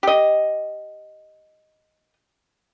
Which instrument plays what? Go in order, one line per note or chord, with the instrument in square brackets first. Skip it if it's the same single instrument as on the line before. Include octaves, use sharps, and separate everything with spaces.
[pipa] G4 D#5